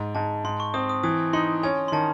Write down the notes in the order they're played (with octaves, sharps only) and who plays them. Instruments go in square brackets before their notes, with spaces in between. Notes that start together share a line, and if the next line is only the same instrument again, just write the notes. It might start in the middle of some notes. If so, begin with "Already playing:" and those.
Already playing: [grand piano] G#2
[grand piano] G#2 [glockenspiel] A5
[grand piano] G#2 [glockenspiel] C6
[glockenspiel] C#6
[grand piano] C4 [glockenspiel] D#6
[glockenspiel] D#6
[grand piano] E3 [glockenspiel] D#6
[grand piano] D#4 [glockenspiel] C6
[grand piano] C#4 [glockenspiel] G#5
[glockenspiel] C6
[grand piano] D#3 [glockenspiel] A5